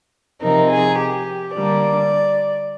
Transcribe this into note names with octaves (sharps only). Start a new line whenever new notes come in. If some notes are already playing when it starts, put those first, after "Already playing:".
C3 F3 C4 D#4 A#4
G#4
G4
D3 G3 A#3 D5